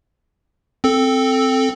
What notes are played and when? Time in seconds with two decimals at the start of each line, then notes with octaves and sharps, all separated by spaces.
0.84 C4 A4